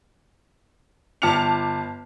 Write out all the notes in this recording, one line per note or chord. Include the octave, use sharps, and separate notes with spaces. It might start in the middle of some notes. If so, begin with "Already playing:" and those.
G1 A5 D6 F6 C#7 F7